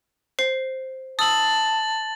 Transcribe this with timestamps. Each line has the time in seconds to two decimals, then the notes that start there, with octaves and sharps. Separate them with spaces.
0.39 C5 C7
1.19 A5 D#6 E6 A6 F#7